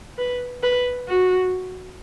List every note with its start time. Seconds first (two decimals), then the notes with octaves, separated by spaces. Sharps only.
0.18 B4
0.63 B4
1.08 F#4